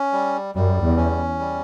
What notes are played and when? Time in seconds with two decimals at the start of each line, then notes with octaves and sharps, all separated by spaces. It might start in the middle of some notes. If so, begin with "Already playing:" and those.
Already playing: C#4
0.12 G3
0.55 F#2 G3
0.82 E2
0.97 C#4
1.39 G3